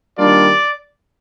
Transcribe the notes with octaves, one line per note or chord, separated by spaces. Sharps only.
D#3 G3 A#3 D4 F4 D5